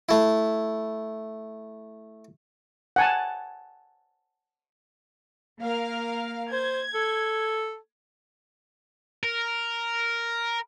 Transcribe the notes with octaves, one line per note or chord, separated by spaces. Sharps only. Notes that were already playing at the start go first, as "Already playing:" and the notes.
A3 E4
F#5 G#5 A5
A#3 A#4 F5
C5 G#6
A4
A#4